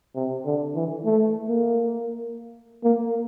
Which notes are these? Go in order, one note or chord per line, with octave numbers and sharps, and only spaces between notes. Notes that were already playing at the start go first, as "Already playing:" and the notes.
C3
D3
E3
A3
A#3
A#3